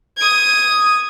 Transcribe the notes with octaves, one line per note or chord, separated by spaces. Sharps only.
D#6 G#6